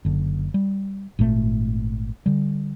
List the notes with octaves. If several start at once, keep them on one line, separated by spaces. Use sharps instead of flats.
F#1 D3
G3
G#1 A#2 A3
D3 G3